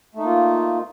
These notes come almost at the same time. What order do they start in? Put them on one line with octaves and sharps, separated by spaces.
A3 D#4 A#3 F4